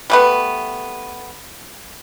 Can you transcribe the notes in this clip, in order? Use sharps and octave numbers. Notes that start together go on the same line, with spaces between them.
G3 A3 B3